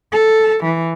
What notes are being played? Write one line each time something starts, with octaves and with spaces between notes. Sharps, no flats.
A4
E3